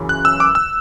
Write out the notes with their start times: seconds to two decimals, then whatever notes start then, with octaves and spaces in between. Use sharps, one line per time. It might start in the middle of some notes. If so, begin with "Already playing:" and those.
Already playing: F#2 C#3 E3
0.09 F#6
0.25 E6
0.40 D6
0.55 E6